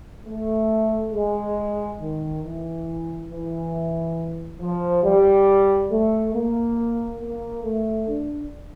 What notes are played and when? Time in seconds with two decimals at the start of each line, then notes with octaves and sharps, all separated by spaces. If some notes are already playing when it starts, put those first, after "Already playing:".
0.27 A3
1.14 G#3
2.00 D#3
2.43 E3
3.30 E3
4.61 F3
5.04 G3
5.90 A3
6.34 A#3
7.20 A#3
7.64 A3
8.07 D4